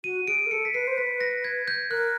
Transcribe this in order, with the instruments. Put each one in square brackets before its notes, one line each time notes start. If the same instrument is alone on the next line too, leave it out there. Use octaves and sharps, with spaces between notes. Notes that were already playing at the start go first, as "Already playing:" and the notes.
[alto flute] F#4 [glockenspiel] D#7
[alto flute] G#4 [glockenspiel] D7
[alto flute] A#4
[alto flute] A4 [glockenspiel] C#7
[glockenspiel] B6
[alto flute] B4 [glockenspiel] C7
[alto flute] C5
[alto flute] B4 [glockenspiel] B6
[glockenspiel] A#6
G#6
G6
[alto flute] A#4 [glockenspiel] F#6